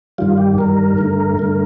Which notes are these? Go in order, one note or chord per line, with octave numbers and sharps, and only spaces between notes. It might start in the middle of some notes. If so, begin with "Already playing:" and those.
G2 D#3 G3 F4
G4
G2 D#3 G3 A#4
G2 D3 A3
G2 D3 A3